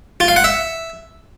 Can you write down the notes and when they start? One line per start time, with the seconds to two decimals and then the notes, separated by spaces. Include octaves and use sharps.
0.20 F4
0.28 F5
0.36 F#5
0.44 E5